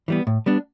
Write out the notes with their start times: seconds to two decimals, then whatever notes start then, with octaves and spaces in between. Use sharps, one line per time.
0.08 E3 G3 B3
0.27 A2
0.46 G3 B3 D4